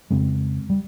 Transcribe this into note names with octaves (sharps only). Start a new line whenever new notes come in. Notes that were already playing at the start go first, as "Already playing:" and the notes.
F2 C#3 G#3 C4
G3